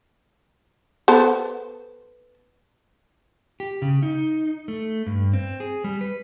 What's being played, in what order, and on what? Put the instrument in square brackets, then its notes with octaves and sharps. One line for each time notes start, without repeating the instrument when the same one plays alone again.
[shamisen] B3 A4 C5
[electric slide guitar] G4
C#3
D#4
A3
G2
C4
G#4
G3
B4